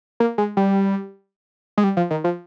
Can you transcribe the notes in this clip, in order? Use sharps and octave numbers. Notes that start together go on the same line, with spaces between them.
A#3
G#3
G3
G#3
G3
F3
D#3
F3